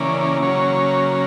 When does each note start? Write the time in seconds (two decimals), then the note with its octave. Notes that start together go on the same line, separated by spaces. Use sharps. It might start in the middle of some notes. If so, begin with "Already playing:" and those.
Already playing: C#3 E3 A#3 C#4 D5
0.42 C#3 F#3 A#3 C#4 C#5